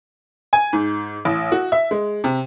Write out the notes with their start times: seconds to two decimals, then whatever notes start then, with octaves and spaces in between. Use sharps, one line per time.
0.53 G#5
0.73 G#2
1.25 A1
1.52 F#4
1.72 E5
1.91 G#3
2.24 C3